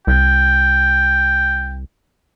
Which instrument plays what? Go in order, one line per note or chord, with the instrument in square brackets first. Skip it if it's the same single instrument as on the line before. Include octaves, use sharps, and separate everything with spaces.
[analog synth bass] C2 [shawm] G5